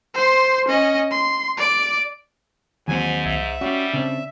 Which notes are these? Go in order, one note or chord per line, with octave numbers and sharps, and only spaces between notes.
C5 C6
C#4 D#5
C6
D5 D7
D#2 G#2 E3 F#3 C4 G#5
C2 E5
G3 C#4 F#4
C#3 C4 D4